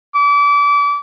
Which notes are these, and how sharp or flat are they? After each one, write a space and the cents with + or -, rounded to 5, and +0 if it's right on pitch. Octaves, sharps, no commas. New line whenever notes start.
D6 -30